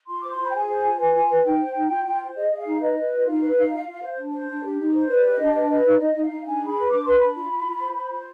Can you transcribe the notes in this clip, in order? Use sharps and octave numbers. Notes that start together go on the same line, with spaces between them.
F4 C6
C5 D6
C6
F4 B5
G5
G#4 G#5
C5
F4
B4 G#5
F4
B4
D#4 G5
C5
D#4
F4
F4
C5
G#4 D#5
G#4
F5
D#4
B4 D#5
B4
F4
D#4 F5
B4
D#4
F4
F4
C5
D4
C5
D4
G4
D#4
C5
B4 D5
G4
D#5
D4
B4 D#5
B4 D#5
D#4 D5
D#4 D#5
D#4
F5
D#4
D4 G#5
G#4
B5
B4
D4 D6
B4 C6
D4 B5
F4
F4
F4
C5
C5
F4